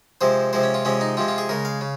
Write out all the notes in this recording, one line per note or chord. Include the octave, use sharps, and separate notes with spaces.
C3 F3 G#3 C5
C3 F3 G#3 C5
C#4
F4
C3 F3 G#3 C#4
D#4
C3 F3 G#3 F4
F4
G#4
C#3 G#3 A#4
F5
C#3